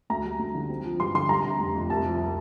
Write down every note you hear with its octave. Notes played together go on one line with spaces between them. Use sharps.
D2 A#5
G3
D2
D3
C4
F3
G2 C6
D3 C6
G3 A#5
C3
F1
F2
C2 A5
F3